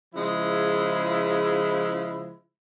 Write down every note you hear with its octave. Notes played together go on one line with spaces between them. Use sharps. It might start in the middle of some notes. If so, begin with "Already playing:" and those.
C#3 F3 G#3 E4